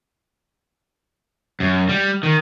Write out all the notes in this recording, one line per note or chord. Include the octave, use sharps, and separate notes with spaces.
F#2
G3
D#3